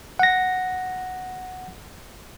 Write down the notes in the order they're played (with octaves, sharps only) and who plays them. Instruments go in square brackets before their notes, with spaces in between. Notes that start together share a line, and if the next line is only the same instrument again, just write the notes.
[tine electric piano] F#5 A#6